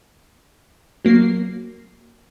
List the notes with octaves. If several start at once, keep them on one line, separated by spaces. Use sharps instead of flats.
F#3 A#3 C7